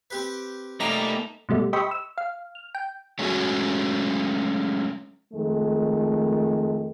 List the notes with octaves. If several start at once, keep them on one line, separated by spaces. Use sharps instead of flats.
C4 G4 B4
G3 A3 A#3 D#4 A#5
G#2 B2 G3 A3
G4 C5 D#5 E5 B5 C#6
E6
F5
F6
G5
F#3 G#3 A3 C#4 F#4
F2 D#3 G#3 A3